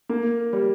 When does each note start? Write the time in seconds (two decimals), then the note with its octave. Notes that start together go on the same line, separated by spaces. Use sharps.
0.09 A#3
0.53 G3